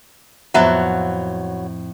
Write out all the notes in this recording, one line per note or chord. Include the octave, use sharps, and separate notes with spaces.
F2 A2 F#3 B3 E5 F5